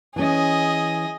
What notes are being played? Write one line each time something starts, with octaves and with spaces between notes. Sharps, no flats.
E3 C#4 G#4 D#5